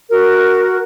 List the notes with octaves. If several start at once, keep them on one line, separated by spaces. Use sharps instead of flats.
F#4 A#4